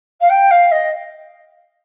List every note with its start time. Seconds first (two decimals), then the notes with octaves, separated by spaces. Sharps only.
0.21 F5
0.29 G5
0.51 F5
0.71 D#5